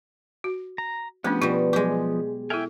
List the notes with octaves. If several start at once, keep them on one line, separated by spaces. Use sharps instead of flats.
F#4
A#5
F3 A3 B3 C#4 D4 G4
B2 G3 F4
F#3 G#3 G4 D6
E4 A4 E5 G5 G#5